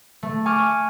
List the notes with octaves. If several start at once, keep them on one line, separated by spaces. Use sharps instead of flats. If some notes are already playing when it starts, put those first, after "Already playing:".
A3
G#5 C#6 D6 F6